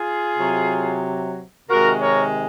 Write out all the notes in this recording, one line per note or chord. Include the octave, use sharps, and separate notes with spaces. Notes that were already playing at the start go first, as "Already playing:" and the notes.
Already playing: F4 G#4
C3 F#3
C3 D#3 G#3 F#4 A#4
A#4 C#5